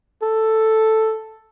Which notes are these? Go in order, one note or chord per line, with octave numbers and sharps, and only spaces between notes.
A4